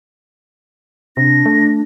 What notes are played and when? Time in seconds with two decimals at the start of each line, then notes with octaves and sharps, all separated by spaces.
1.17 C3 D4 A#6
1.46 A3